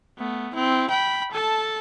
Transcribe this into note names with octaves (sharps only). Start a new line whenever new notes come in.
A3 B3
C4 E4
G5 B5
A4 A5